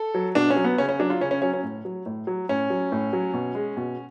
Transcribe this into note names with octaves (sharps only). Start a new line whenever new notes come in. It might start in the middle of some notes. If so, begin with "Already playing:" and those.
Already playing: A4
F#3
B2 D4
C#4
F#3
B3
C#3 C#4
C#4
F#3 D4
F4
C#3 C#4
C#4
F#3 C#4
C#4
A2
F#3
A2
F#3
A2 C#4
F#3
A2
F#3
B2
G#3
B2